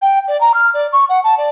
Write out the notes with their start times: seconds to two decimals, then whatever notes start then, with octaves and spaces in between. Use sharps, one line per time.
0.02 G5
0.28 D5
0.41 A#5
0.54 F6
0.74 D5
0.93 C#6
1.09 F#5
1.24 A5
1.38 D5